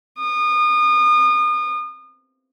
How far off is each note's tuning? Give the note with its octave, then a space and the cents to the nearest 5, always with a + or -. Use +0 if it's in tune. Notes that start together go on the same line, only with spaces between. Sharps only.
D#6 -35